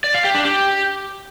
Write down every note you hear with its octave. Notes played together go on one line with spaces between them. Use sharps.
D5
F5
G4
D4
G4